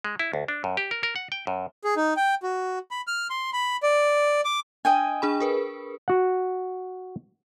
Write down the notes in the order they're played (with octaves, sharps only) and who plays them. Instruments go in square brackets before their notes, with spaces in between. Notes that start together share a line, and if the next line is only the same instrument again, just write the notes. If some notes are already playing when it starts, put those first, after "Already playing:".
[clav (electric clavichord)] G#3
E4
D2
D4
F#2
G4
A#4
A#4
F#5
G5
F#2
[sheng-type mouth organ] G#4
D#4
G5
F#4
B5
F6
C6
B5
D5
D6
[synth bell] D4 [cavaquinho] D#5 G5 G#5
[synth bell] D4 G#4 B5
G#4 A#4 B4
[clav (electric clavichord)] F#4 F#5